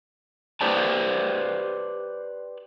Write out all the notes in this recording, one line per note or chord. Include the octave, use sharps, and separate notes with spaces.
G4 B4 C5 D5 G5 A5